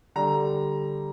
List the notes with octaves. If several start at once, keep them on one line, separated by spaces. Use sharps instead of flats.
D3 G3 A#5